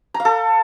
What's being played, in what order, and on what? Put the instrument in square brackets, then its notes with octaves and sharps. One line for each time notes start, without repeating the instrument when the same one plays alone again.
[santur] A#5
F5
A4